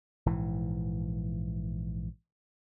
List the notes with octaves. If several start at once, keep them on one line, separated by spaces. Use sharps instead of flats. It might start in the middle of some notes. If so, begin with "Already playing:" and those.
A#1 G#2 E3